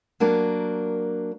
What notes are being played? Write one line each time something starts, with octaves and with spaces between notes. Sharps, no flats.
F#3 A#3 D4 A#4